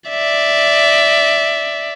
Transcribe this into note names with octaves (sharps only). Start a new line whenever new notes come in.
D5 E5